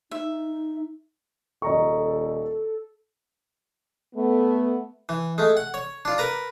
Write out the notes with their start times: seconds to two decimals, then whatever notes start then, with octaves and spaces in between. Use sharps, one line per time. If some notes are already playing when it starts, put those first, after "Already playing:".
0.11 D#4 E5
1.62 D#1 A4 D#5 A#5 C#6
4.15 A3 B3
5.09 E3
5.38 G#3 A3
5.57 F#5
5.74 C#5
6.05 D4 F4
6.18 A#4 B4 A#5